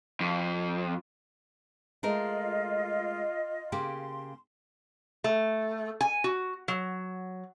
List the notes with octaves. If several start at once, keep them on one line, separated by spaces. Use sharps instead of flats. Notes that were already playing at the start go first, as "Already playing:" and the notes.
F2
G#3 A3 F4 A#4 D#5
C#3 A#3 G4 C6
A3
G#5
F#4
F#3